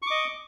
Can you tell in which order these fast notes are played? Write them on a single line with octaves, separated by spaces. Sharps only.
C#6 D6 D#5